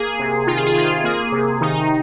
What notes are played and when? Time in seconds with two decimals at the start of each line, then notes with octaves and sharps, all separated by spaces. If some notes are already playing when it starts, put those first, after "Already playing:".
Already playing: A#3 G#4
0.19 C3
0.47 D#3 F4
0.57 G#4
0.67 F4
0.76 D#3
1.04 A#3 G#4
1.32 C3
1.61 D#3 D#4